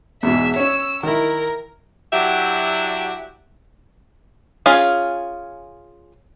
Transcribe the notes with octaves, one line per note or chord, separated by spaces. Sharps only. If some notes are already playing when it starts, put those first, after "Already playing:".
E2 G#2 B2 E5
C#4 C#5 E6
D#3 E4 A#4
F#3 D4 E4 F#4 G4 E5
C#4 F4 G#4 F5